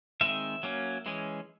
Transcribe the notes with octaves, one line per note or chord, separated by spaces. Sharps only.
D#3 G#3 C4 E5
F#3 A#3 C#4
E3 G#3 C#4